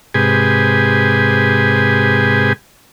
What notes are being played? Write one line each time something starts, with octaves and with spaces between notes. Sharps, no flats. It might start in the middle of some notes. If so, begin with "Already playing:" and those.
G#2 C3 G4 G#4 B4 G#5